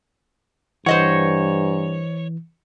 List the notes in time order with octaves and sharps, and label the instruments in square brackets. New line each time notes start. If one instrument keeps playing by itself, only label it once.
[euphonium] G2 [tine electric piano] E3 [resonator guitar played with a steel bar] C5 D#5 F#5 [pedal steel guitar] C#5